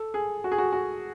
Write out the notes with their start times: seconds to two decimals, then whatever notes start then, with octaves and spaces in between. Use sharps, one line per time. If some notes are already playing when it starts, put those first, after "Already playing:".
Already playing: A4
0.14 G#4
0.44 F#4
0.52 G#4
0.58 F#4
0.73 F#4